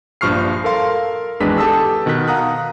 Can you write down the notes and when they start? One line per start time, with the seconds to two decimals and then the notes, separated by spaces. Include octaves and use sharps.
0.21 A#1 G2 F3 C#6 F6 C7
0.64 A4 A#4 F5 C6
1.40 G#1 E2 G#3 D4 B4 B6
1.58 G4 A4 A5 D#6 E6
2.06 B2 D#3 B3 F#6 B6
2.28 F5 F#5 A#5 D#6 F#6